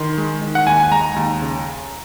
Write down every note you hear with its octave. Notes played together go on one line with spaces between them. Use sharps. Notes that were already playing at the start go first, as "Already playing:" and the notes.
Already playing: D#3 C6
G#3
D#3
F#5
D#2 G#5
G#5
G#3 A#5
D#2
C#3